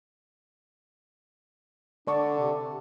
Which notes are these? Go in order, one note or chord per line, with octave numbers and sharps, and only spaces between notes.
D3 D4 D5 A5 C#6
C3